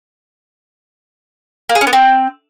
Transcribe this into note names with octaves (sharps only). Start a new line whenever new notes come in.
A#3
G#4
C#4
B3
C4